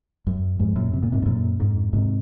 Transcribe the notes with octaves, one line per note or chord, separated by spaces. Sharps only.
F#2
F2 G#2
F#2 A#2
C3
A#2
G#2 C3
G#2
F#2 A#2
F2 G#2
G#2 C3